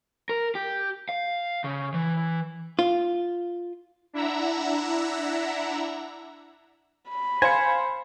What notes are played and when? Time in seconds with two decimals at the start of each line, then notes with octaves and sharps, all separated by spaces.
0.29 A#4
0.55 G4
1.09 F5
1.64 C#3
1.94 E3
2.79 F4
4.13 D4 E4 E5 F#5 A#5 E6
7.09 B5
7.42 C5 F5 G#5 C#7